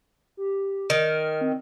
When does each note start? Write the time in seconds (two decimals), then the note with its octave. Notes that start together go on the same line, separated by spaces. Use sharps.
0.37 G4
0.90 D#3 F6
1.41 C4